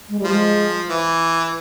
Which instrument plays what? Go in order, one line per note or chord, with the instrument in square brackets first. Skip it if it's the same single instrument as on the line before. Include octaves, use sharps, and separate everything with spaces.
[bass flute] G#3
G3
[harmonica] F3
[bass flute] G#3
[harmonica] E3